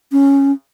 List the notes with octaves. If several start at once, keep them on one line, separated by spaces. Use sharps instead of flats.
C#4